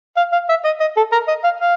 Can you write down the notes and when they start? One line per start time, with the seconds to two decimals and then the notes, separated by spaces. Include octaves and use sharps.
0.17 F5
0.32 F5
0.49 E5
0.65 D#5
0.80 D#5
0.97 A4
1.12 A#4
1.28 D#5
1.44 F5
1.60 F5